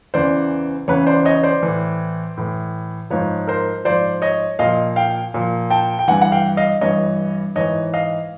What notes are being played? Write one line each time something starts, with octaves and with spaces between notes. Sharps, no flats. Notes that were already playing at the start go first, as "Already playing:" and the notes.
E2 C#3 E3 C5 D5
E2 C#3 E3 B4 C#5
C5 D5
C#5 D#5
C5 D5
A2 E3
A2 E3
G#2 F3 B4 C#5
A#4 C5
G#2 F3 C5 D5
C#5 D#5
A#2 F3 D#5 F5
F5 G5
A#2 F3
G5 A5
G5
G2 E3 F#5 G#5
F#5
F5 G5
D#5 F5
G2 E3 C#5 D#5
G#2 E3 C#5 D#5
D#5 F5